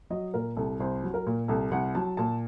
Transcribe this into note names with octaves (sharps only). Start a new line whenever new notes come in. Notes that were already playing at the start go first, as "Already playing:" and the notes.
F#3 D#5
A#2 A#4
C2 A4
C2 C5
F#3
A#4
A#2
C2 A4
C2 F#5
F#3 A5
A#2 A5